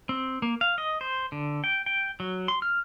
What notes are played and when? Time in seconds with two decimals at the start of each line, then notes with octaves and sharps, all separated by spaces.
0.09 C4
0.42 A#3
0.61 F5
0.78 D#5
1.01 C5
1.32 D3
1.64 G5
1.86 G5
2.20 F#3
2.48 C6
2.62 F6